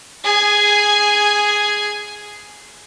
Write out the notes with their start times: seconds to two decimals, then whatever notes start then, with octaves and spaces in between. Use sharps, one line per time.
0.24 G#4 G#5